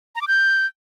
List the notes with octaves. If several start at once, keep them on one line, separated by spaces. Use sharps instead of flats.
A#5
D6
G6